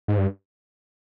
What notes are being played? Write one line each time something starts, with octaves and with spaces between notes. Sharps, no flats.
G#2
G2